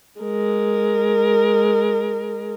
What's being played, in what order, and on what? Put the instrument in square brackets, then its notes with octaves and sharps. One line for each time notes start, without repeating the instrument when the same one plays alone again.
[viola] G#3 A#4